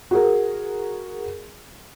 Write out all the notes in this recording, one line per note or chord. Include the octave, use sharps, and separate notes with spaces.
F#4 G#4 A#4